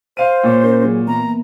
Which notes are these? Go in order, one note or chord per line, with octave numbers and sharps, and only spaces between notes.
C5 F5 D#7
A#2 C#5
C#4 A#4
F#3 G#4
E3 A#3 B3 A#5